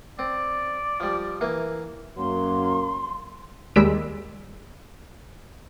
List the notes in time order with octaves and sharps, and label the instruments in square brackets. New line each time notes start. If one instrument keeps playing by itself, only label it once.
[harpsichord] C4 [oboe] D5
[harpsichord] F3 G3
E3 A#3
[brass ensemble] F#2 F#3 A#3 [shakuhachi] C6
[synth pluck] D#2 G3 G#3 E6 B6 D7